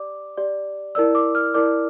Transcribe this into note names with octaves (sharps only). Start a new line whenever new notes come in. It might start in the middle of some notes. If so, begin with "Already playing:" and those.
Already playing: G4 D5 D6
G4 D5
E4 A#4 D5 E6
D6
F6
E4 A#4 D5 D6